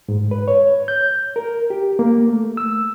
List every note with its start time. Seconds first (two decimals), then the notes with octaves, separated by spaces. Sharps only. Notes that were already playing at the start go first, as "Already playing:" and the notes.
0.09 G#2
0.31 B4
0.48 C#5
0.88 G6
1.36 A#4
1.70 G4
1.99 A#3
2.28 A3
2.57 E6